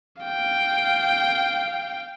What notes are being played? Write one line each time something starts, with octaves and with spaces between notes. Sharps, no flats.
F5 G5